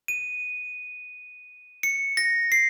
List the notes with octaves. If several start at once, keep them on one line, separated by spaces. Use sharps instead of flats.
D#7
C#7
A#6
C7